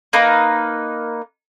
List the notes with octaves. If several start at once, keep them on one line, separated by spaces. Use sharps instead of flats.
A#3 D#4 B4